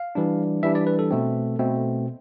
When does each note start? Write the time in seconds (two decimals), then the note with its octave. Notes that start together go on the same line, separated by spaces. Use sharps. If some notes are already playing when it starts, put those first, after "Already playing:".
Already playing: F5
0.15 E3 G3 D4
0.63 E3 G3 D4 E5
0.75 D5
0.87 B4
0.99 A4
1.11 B2 A3 C4
1.59 B2 A3 C4